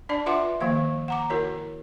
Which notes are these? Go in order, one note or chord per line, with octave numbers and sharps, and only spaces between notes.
D4 D5 A5
F4 B4 E5 F#5 C6 D6
D#3 F3 A#3 F5
F#5 A#5 D6
E4 F#4 A#4 C#5